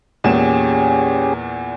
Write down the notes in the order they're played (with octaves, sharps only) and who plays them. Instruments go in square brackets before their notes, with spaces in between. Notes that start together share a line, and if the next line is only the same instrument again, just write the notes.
[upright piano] E2 A#2 E7 [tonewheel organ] C#4 G4 G#4